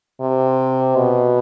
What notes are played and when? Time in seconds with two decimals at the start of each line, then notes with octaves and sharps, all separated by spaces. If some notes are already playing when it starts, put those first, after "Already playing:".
0.21 C3
0.96 B2